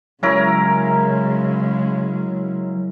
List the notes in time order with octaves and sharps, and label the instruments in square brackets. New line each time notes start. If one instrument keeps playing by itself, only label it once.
[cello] C#3 G#3 [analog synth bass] F#3 [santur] C#4 E4 A#4